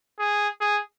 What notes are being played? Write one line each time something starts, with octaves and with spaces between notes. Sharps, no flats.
G#4
G#4